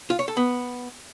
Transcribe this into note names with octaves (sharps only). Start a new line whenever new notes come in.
F4
C#5
A4
B3